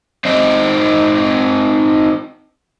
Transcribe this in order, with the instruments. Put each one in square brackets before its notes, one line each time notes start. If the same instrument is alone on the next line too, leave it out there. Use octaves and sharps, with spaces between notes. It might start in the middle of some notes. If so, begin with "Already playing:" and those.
[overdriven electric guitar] C4 D#4